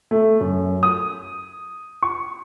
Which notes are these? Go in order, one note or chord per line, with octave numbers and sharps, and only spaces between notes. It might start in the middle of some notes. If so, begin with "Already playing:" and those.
A3
F#2
D#6
C#6